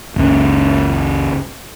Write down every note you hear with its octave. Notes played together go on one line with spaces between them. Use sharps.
F#1 C#2 C#3